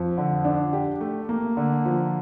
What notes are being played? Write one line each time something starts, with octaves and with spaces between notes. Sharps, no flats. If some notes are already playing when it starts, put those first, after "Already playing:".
Already playing: F2
D3
D4
G4
A3
A#3
D3
F3